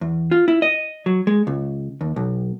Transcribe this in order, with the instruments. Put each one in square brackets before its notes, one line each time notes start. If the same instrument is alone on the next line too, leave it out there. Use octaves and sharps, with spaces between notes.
[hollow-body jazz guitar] E2
F4
E4
D#5
F#3
G#3
C#2
D#2
B1